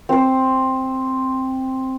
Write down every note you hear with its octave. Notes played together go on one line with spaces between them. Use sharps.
C4 C5